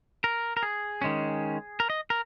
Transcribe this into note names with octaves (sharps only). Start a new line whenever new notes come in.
A#4
A#4
G#4
D#3 G#3 C#4
A#4
D#5
A#4